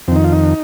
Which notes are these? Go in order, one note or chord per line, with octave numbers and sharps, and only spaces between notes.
F2 D#3 C4 D#4
F4
D#4